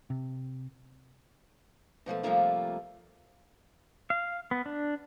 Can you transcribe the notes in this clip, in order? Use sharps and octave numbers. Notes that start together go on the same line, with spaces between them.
C3
B2 F3 F#3 A3
C3 F3 G3 A3 A#3 F4
F5
B3
D4